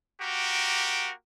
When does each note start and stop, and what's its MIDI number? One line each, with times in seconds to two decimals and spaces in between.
0.21 1.12 58
0.21 1.12 66
0.21 1.12 67
0.21 1.12 70